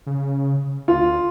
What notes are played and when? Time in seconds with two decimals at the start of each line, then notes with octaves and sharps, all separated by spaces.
0.07 C#3
0.88 D2 F4